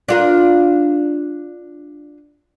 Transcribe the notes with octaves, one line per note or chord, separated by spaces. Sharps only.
D4 F4 A#4